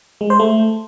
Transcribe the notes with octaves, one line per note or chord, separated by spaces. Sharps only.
G#3
C5
A3